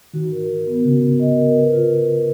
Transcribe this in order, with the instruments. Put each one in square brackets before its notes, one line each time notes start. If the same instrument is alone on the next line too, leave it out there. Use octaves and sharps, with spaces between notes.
[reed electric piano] D#3 [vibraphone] F#4
[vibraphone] A#4
F#4
B3
[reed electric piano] C#3 [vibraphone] F#4
[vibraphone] B3
D#5
A#4
B4
F4
F4
F4